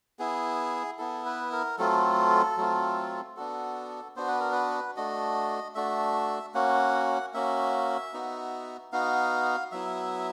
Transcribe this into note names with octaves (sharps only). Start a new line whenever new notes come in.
B3 E4 G#4
B3 E4 A4
B4
A#4
F#3 A3 C4 F4 A4
F#3 A3 C4 F4
B3 D4 F#4 A4
B3 D4 F#4 C5
B4
A#4
B4
A3 D4 F#4 D#5
A3 D4 F#4 E5
A#3 C#4 F#4 F#5
A#3 C#4 F#4 E5
B3 D#4 F#4
B3 D#4 F#4 F5
F#3 B3 E4 E5